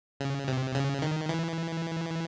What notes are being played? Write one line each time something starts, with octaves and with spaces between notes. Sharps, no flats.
C#3
C3
C#3
D#3
E3